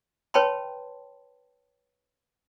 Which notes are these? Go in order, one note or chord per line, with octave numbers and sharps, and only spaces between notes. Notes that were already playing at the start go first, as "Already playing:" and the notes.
B4 C#5 G5 A5 B5 C6